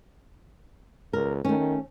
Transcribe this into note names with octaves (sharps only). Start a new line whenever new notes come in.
C#2 A#4
D#3 A3 C#4